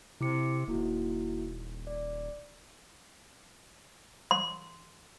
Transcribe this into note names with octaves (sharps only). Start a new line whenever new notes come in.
C3 E4 D6 C#7
D#1 A#3 E4 F#4
D5
C6